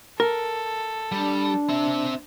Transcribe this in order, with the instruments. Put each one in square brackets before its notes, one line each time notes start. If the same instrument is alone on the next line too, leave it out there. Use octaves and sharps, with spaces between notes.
[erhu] A4 [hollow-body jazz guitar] A#4
[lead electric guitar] G3 [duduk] D4
[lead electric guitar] C4 E5